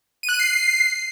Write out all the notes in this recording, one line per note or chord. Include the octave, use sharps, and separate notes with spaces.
D#7
F#6
D#7
C7